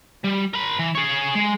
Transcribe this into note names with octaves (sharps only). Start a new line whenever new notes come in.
G3
A#4 B5
E3
G#4 C#5
G#3